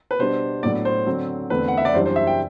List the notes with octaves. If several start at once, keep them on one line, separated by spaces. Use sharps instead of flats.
B4
B2 G3 D4 C5
A2 F#3 B3 D4 D5
C5
D3 F#3 C4
E2 D3 A3 C4 B4
F#5
E5
D5
F#2 E3 G3 D4 C5
C5
E5
G5